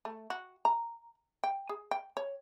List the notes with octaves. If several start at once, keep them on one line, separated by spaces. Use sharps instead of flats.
A3
F#4
A#5
G5
G#4
G5
C#5